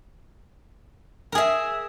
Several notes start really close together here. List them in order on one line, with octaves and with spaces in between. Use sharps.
A#4 G#4 E5